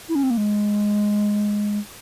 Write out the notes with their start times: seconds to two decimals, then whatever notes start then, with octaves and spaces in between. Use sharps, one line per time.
0.09 E4
0.15 C#4
0.23 C4
0.30 A#3
0.37 G#3